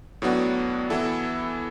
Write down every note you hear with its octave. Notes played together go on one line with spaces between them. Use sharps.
A2 F#3 B3 D4 F#4
E3 B3 E4 A4